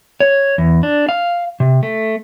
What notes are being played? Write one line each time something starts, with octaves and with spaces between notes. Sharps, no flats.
C#5
E2
D4
F5
C3
A3